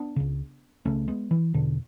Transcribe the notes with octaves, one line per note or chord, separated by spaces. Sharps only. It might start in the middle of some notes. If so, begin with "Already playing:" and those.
Already playing: B3 D4
C#2 C#3
C#2 C#3 A3 C#4
G#3 B3
E3
E2 B2 D3